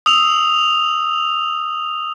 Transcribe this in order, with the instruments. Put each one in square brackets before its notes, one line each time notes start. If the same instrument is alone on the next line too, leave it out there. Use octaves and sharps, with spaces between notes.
[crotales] D#6 E6 F7